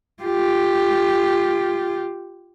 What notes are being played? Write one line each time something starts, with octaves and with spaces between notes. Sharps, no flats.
F4 G4